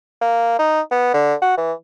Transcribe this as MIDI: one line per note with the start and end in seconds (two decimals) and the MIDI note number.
0.21 0.58 58
0.59 0.81 63
0.91 1.10 59
1.14 1.34 50
1.42 1.56 66
1.57 1.73 52